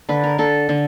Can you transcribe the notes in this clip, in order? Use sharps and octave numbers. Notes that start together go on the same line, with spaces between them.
D3 B4
A#4
D3 A4
D3